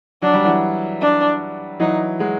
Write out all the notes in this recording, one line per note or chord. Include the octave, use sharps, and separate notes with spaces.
F#3 D4
G3
E3 F#3
D4
E3 F#3 D#4
F#3 G#3